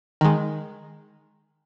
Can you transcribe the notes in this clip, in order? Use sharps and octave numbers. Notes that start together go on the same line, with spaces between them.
D#3 G#3